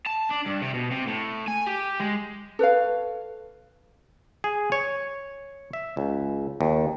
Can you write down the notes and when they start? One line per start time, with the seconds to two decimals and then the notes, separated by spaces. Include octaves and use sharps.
0.07 A5
0.31 D4
0.46 G2
0.62 C3
0.74 B2
0.91 C3
1.07 A2
1.48 G#5
1.67 G4
2.00 G#3
2.59 A4 B4 C#5 F5
4.44 G#4
4.72 C#5
5.73 E5
5.97 C#2
6.61 D#2